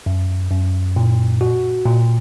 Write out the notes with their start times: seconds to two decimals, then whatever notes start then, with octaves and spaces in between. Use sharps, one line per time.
0.06 F#2
0.51 F#2
0.96 A#2
1.41 F#4
1.86 A#2